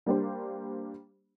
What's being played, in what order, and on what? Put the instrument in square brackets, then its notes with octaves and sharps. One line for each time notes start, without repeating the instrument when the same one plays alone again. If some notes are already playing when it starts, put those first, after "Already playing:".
[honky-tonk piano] G3 A#3 D4 G4 C5